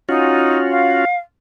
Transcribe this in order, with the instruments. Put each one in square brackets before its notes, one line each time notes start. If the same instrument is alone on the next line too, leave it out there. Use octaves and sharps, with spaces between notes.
[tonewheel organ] C#4 F4 F#4 [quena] D#4
[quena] F5